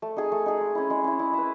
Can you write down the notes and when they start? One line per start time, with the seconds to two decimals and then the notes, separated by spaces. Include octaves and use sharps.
0.02 A3
0.17 D#4 G#4
0.32 A3
0.46 D#4 G#4
0.60 G#3
0.75 C#4 E4
0.90 G#3
1.04 C#4 E4
1.19 E4
1.33 B4 E5